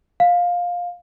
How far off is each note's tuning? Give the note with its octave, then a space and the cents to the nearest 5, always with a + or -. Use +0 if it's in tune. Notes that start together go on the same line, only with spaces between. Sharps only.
F5 +15